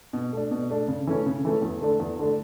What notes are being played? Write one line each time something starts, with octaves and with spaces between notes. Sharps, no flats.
B2
A3 D4
B2
A3 D4
C#3
E3 A3 C#4
C#3
E3 A3 C#4
E2
D3 A3 D4
E2
D3 A3 D4